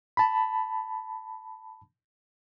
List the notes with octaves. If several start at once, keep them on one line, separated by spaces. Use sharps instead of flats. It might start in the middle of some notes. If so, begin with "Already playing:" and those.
A5 B5